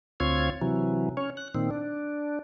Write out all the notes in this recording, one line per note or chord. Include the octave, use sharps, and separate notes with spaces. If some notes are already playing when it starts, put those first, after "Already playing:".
D2 C4 F4 C#5 G#6
C3 E3 F#3
C#4 C#5
F#6
A#2 D#3 C4
D4